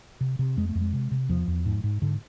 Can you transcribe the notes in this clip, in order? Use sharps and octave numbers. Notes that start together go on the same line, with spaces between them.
C3
C3
F2 G#3
A3
F2
G#3
C3
C3
E2 F3
E2
G#2
G#2
G#2 D3